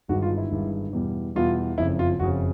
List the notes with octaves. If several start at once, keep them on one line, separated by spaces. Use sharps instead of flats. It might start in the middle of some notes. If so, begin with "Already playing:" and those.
G1 G2 D#3 G#3 F#4
F4
E4
G1 G2 D#3 G#3
E2 B2 G3
E2 B2 G3 F4
F#1 F2 C#3 E4
F4
F#1 F2 C#3 F#4